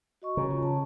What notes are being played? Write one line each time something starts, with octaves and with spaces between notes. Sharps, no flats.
F#4 D#5 C#6
C#3 A#5
F4
A5